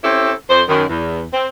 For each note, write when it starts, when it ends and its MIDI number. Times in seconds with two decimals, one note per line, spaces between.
0.04 0.33 60
0.04 0.33 61
0.04 0.33 64
0.04 0.33 67
0.04 0.33 69
0.50 0.63 41
0.50 0.63 72
0.69 0.84 42
0.69 0.84 51
0.89 1.23 40
1.33 1.47 60